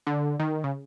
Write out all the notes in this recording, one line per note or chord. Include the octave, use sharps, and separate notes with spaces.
D3
D#3
C#3